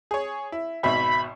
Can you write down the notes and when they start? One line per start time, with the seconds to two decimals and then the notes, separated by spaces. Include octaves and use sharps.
0.11 G#4 C#5
0.52 E4
0.83 G#1 B2 E5 B5